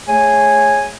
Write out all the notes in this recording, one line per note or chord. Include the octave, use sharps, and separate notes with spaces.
A3 G#4 C#5 G#5